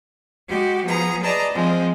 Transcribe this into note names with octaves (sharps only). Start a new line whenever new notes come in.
G#3 F#4 G4
F3 B3 G#4 A#5
G#4 B4 D5 D#5 A5 A#5
F3 G#3 C4